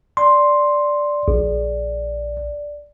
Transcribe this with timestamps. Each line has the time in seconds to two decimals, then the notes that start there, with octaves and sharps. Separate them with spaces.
0.17 D5 C6
1.28 A#1